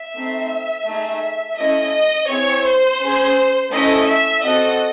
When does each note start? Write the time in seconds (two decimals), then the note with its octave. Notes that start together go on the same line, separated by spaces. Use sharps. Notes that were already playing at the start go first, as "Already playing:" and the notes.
Already playing: E5
0.14 A3 C4 D#4
0.85 A3 D#4 G#4
1.57 A3 C#4 E4 D#5
1.93 D#5
2.28 C4 E4 G#4 C#5
2.64 C5
3.00 C#4 G#4
3.71 A3 C#4 E4 A4 D#5
4.07 E5
4.43 C4 F#4 A4 D#5